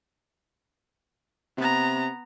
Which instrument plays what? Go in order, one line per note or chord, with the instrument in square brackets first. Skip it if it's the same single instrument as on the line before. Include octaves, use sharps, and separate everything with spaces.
[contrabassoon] C3 [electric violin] B3 A#5